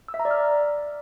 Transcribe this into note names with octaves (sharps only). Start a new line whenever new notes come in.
E6
E5
A#5
D5
F6